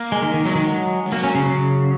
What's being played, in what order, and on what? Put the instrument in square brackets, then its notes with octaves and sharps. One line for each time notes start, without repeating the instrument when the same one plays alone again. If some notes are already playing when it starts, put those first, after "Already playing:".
Already playing: [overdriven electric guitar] A#3
[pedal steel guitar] G#3
D#3
D#3
[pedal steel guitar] F#3 [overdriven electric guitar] G#3
[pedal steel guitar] D#3
F#3
[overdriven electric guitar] D#3
[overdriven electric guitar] F#3 [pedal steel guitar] A#3
[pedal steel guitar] C#4
C#3
C#3